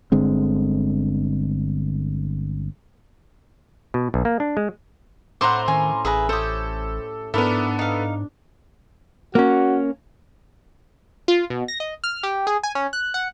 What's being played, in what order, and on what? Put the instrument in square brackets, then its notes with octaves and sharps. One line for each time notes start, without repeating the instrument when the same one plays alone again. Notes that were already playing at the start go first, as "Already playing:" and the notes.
[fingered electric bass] G1 D3 G#3 C4
[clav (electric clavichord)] B2
B1
A#3
D4
G#3
[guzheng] A2 C4 E4 [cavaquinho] C5 F#5 [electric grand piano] A#5 C6 D6
[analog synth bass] D#3 [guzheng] C#4 [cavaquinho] G#5
[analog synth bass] A1 [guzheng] E4 [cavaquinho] G#4 B4 A#5
[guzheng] G4 C#5 [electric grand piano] A4 [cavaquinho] C5 D#6
[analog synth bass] G#2 [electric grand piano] B3 A4 [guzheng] D4 [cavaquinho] E4 A#4 D5
[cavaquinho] D#4 F5
[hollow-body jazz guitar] A#3 C#4 [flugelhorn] F#4
[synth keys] F4
B2
A#6
D#5
F6
G4
G#4
G#5
C#4
F#6
F#5